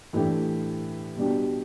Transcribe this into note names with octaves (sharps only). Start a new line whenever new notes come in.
A2 E3 A3 D4 G4
B2 G3 D4 G4